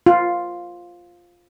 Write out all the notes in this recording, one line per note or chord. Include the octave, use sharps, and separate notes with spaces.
F4